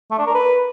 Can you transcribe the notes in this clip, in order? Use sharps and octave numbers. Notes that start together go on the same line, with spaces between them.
A3
D4
A#4
B4